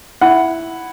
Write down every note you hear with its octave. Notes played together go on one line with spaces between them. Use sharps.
E4 F#5